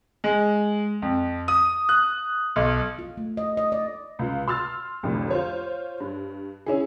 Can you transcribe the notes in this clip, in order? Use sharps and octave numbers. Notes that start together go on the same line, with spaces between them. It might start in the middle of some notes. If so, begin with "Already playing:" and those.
G#3
F2
D#6
F#6
B1
F4
A3
D#5
D#5
D5
C#2 F4
C6 E6 F6 A6
C2 F2 A2 D3
F4 C5 C#5
G2
C#4 E4 G#4